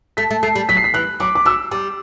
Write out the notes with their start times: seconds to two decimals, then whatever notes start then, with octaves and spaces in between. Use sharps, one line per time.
0.17 A3 B6
0.31 A3
0.43 A3 C7
0.56 G3
0.69 F#3 B6
0.77 C7
0.84 B6
0.94 E3 F#6
1.20 F#3 D6
1.35 D6
1.45 F#3 E6
1.71 G3 D6